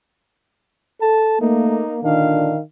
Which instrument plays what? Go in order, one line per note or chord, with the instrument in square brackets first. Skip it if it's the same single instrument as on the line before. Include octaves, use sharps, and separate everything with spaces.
[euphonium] A4 [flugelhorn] A5
[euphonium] A3 [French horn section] A#3 [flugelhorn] D#4
[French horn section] A#2 D3 D4 [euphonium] D#3 [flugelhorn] F5